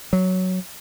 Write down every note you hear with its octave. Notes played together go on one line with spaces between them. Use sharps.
F#3